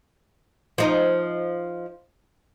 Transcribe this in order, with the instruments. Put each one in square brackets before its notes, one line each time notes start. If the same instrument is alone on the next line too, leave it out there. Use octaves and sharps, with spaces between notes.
[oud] F3 D#4